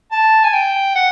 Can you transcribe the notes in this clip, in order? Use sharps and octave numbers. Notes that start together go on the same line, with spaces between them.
A5
G#5
G5
F#5